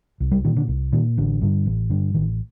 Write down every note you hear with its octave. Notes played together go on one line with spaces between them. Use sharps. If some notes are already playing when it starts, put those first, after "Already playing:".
C2
G3
A#2 D#3
D3
C2
A#2 D#3
A1 D3
G2 D3
A1
G2 D3
A1 D#3